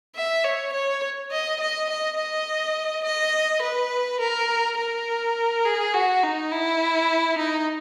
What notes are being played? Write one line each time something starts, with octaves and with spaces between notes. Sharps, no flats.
E5
C#5
C#5
D#5
D#5
D#5
D#5
D#5
B4
A#4
A#4
G#4
F#4
D#4
E4
D#4